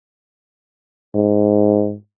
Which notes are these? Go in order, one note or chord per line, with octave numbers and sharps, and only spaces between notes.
G#2